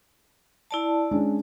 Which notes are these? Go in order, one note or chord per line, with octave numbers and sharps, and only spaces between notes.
E4 D5 A5
G#3 C#4 D4